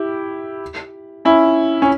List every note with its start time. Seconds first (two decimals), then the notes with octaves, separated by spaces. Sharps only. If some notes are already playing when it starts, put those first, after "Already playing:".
Already playing: E4 G4
1.25 C#4 E4
1.82 C#4